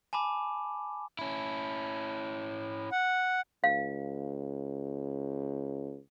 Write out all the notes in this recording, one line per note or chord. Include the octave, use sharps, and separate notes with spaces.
G#5 A5 B5 D6
C#4 E4
F#5
C#2 F5